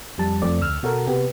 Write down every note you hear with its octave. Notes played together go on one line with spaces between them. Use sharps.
F2 G3 A5
F2 A3 C4 D5
D2 E6 F6
B2 F#4 A4 A#4
C3 B3 G4